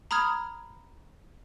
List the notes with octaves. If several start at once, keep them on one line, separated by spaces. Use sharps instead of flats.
A#5 B5 D#6 F6 G#6